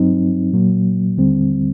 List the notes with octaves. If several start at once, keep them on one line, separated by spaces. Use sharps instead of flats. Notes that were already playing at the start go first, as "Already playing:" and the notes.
Already playing: G2 F#3 C4 D#4
A#2 F#3 A#3
D#2 D3 G3 C4